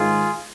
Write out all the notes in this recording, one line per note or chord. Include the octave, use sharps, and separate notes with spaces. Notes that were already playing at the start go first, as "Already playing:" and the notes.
Already playing: G#2 D#3 G#3 F4 G#4